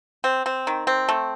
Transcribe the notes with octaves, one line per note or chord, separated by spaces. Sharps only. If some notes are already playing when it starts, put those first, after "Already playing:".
C4
C4
D#3
C4
A3